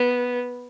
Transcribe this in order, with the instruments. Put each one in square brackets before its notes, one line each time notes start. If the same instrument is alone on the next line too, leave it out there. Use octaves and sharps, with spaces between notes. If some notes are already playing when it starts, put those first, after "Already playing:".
Already playing: [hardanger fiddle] B3